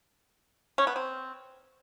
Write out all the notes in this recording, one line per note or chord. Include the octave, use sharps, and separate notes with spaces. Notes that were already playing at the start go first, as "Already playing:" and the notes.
C#4
B3
C4